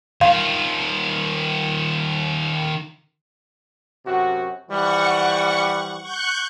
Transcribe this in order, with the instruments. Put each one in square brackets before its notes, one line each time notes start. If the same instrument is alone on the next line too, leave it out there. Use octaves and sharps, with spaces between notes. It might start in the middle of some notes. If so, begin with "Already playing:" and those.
[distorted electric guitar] D#3 F4 [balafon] F5
[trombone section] F#2 C3 F#4
[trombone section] E3 F3 G3 [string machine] F#5 C#6
[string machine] C#6 F#6 G6